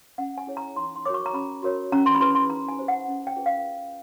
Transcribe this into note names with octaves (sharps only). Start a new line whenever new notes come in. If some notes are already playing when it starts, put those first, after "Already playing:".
C#4 F#5
G#5
E4 G#4 C#5
A#5
D#4 C6
C6
F#4 A#4 C#5 D6
C#6
A#5
C#4 B5
F#4 A#4 C#5
C#4 A#5
C6
B5
E4 G#4 B4 C6
C6
D#4 A#5
G#5
G4 C5
F#5
C#4
G5
F4 G#4 B4
F5